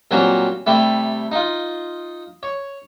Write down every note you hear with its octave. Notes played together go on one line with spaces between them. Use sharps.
A#2 F#3 G3 A#3 C4 C#4
C3 G3 A3 E4
D#4 F4
C#5